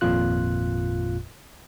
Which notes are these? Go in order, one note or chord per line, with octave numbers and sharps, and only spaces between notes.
G#1 F2 A#2 F4 F#6